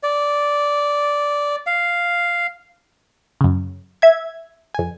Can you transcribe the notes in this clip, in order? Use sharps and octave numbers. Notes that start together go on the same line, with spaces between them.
D5
F5
F#2 C#3
E5 G#6
F2 G#5